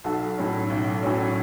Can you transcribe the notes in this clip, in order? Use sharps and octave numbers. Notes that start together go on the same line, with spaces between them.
B1 F#4 A4
A2 F#3 C#4
B1
A2 F#3 C#4